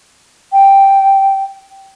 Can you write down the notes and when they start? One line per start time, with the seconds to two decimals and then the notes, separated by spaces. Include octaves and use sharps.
0.52 G5